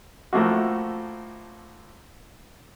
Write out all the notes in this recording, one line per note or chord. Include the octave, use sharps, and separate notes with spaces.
A2 F3 A3 A#3 F#4